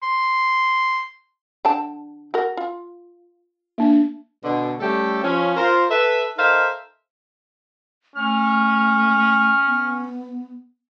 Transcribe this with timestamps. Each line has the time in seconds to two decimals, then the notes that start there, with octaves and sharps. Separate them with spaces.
0.02 C6
1.65 D3 G5 A5
2.34 F#4 A#4
2.57 F4
3.78 A#3 D4
4.44 B2 D3
4.80 G3 A3 C#4 G4 A4
5.24 F3 C#4
5.56 F4 A#4 C5
5.90 A4 B4 E5
6.38 D#4 A4 A#4 C5 E5 F5
8.16 A3 C#4 F6
9.68 B3